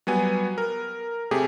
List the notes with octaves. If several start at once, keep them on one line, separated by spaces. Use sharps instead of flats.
F#3 G3 B3 G#5
A#4
C3 A3 G4 G#4